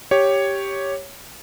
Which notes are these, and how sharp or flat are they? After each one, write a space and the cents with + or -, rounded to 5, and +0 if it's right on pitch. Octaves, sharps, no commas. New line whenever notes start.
G4 +0 C#5 +0